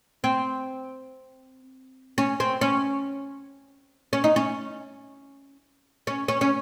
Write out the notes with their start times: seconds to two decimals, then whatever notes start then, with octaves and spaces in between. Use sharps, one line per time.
0.24 C4
2.18 C#4
2.40 C4
2.61 C#4
4.13 C#4
4.24 D#4
4.36 C#4
6.07 C#4
6.28 C#4
6.41 C#4